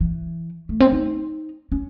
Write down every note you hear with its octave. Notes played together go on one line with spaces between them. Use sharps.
E3
A3
C4
D#4
C#4